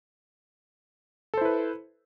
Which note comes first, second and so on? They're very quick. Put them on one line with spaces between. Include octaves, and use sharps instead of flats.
A4 C5 E4 B4